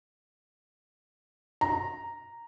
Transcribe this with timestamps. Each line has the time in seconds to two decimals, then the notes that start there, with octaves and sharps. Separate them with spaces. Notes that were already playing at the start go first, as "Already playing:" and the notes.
1.61 A#5